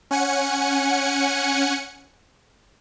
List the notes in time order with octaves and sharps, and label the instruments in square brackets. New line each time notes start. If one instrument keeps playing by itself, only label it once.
[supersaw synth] C#4 F#5 G#5 C#7